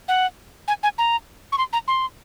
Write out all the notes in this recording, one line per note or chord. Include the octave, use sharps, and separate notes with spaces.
F#5
G#5
G#5
A#5
C#6
C6
A#5
C6